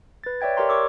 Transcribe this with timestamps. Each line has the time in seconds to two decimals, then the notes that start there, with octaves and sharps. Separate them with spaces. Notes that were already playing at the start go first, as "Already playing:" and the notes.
0.24 B4 A6
0.41 C#5 D5 E5 G5 G#6
0.57 G4 A#4 C#5 D5 A#5 C6
0.69 G4 A#4 C#6 D6 E6